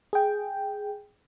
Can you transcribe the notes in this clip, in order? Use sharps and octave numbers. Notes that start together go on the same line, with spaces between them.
G#4 G5